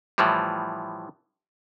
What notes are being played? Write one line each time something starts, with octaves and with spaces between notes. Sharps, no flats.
A2 E3 F3 G3